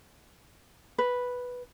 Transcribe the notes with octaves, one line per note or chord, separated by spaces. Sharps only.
B4